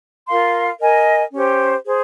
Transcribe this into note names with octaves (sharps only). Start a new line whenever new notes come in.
F4 A#4 F5 C6
A#4 D#5 G#5
C#4 G4 C5
G#4 C5